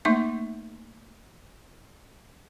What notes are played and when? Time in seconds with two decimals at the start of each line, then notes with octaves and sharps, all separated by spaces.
0.05 A3 A#3 D#4 E5 C#6 D6